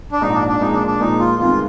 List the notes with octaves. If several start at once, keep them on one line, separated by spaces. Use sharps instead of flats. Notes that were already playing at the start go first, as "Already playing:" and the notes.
D4
A#1 G#2 F3 D#4
D4
D4
A#2 F3 G#3 D#4
D4
D4
A#2 F3 G#3 D#4
F4
G1 F2 D#3 G#3 F4